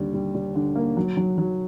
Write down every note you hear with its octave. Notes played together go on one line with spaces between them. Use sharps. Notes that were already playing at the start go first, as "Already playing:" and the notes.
Already playing: D#2 D3 G3
G3
G3
D3
A#3
F#3
F#3
F#3